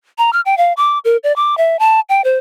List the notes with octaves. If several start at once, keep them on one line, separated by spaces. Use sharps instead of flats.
A#5
F6
G5
F5
D6
A#4
D5
D6
E5
A5
G5
C5